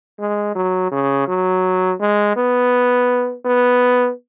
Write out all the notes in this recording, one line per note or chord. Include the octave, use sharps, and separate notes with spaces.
G#3
F#3
C#3
F#3
G#3
B3
B3